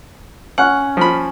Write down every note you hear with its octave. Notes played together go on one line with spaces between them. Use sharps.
C#4 F#5
F3 B5